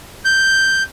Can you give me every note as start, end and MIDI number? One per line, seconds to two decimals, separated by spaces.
0.25 0.83 91